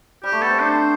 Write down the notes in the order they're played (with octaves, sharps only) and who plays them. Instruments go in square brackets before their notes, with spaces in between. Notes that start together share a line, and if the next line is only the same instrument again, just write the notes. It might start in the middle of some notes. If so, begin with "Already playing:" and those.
[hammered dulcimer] G3 [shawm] G4
[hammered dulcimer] A3
[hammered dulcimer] B3 [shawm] A4
[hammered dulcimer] C4
[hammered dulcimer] D4 [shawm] C5